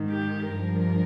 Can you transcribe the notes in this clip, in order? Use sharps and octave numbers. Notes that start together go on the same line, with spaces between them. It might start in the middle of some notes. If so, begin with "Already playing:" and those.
Already playing: G#2 D#3
G4
G2 F3 A#4